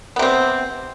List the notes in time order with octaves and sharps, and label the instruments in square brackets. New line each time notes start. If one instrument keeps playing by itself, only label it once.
[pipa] B3
C3
C4